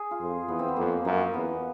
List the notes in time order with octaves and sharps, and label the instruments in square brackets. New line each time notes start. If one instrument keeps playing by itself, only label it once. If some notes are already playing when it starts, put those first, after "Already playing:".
Already playing: [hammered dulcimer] G#4
F4
[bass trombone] F2
[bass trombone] E2 [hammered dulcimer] B3
[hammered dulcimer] C4
B3
[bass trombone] F2 [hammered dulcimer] A#3
[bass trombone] F#2 [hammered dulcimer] A#3
[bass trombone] E2 [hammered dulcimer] B3